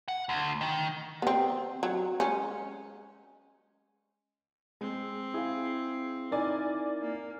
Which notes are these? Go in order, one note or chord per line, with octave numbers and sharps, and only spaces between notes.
F#5
D2
D#3
B3 C4
F#3
G#3 C#4
G#3 C4
E4 G#4 F5
D#4 E4 A#4 D5 G#5
A#3